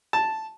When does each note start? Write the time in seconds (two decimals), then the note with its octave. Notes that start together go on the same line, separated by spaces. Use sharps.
0.13 A5